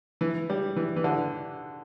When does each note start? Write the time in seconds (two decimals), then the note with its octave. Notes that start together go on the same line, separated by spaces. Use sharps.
0.21 E3
0.50 G3
0.76 E3
0.96 E3
1.04 D3